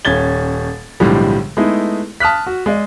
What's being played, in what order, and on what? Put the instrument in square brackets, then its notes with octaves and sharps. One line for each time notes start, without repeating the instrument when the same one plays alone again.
[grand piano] D#1 C#4 G#6 A6 G7
B1 A2 D3 F3 G3 G#3
G#3 A3 B3 D#4 E4
A5 D#6 F6 F#6 B6
F#4
G#3 D5 D#5